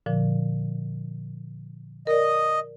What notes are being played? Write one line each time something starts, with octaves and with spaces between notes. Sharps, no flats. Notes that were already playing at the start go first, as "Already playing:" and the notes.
A#2 D3 F3
A#4 D5 D#5